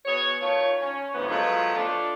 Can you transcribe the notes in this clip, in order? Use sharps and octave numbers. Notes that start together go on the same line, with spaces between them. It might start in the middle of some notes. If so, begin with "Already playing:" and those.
B3 F#4 G#4 C#5
D#3 A3 F4 C#5
C#4
D2 G#2 E3 F3 B3
F3 F#3 G#3 A3 B3 F4
A3 D4 F4